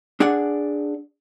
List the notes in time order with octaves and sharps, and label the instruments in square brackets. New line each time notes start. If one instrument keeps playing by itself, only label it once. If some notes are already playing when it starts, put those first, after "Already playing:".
[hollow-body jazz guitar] D4 G#4 D5 F#5